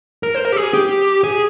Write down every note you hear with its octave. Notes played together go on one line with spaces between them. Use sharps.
A#4
C5
A#4
G4
G#4
G4
G#4